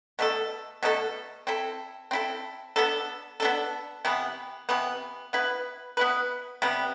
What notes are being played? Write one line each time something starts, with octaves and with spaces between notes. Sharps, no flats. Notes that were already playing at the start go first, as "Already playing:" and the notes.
B2 A3 D4 A4
B2 A3 D4 A4
C4 E4 A4
C4 E4 A4
B3 D4 A4
B3 D4 A4
C3 E3 B3
C3 E3 B3
B3 E4 B4
B3 E4 B4
C3 G3 B3